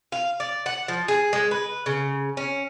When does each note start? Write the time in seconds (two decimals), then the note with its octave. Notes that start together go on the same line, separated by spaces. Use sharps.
0.12 F5
0.40 D5
0.66 F#5
0.88 F3
1.08 G#4
1.33 G#3
1.51 B4
1.86 C#3
2.37 C#4